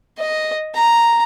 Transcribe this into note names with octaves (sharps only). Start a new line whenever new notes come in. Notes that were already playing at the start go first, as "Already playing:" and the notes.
D#5
A#5